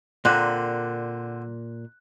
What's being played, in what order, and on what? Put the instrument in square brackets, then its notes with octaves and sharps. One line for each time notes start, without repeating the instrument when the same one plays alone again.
[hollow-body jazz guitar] A#2 A#3 [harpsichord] D3 C4 [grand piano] F#6